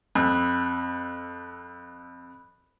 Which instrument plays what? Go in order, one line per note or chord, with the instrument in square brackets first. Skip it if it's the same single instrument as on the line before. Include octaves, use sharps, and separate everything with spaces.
[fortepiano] F2 [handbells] B5 E6 F#6